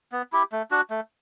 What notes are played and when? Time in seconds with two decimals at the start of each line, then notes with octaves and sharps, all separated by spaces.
0.12 B3
0.33 E4 G4
0.52 A3
0.71 D4 F#4
0.90 A3